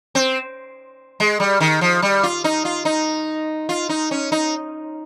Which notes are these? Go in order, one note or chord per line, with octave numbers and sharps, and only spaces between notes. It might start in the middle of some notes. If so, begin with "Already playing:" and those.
C4
G#3
G3
D#3
F3
G3
F4
D#4
F4
D#4
F4
D#4
C#4
D#4